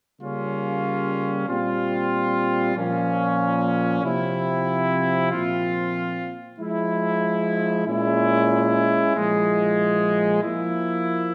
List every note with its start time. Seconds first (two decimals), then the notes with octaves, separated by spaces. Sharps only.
0.21 C#3 G3 A#3 C#4 F4
1.48 A#2 G3 C4 F4
2.76 A#2 F3 A#3 C#4
4.04 C3 F3 C4 E4
5.32 A#2 F3 C4 F4
6.58 F3 G#3 E4
7.86 A#2 G#3 C#4 E4
9.14 A#2 F3 G#3 E4
10.42 F3 A#3 E4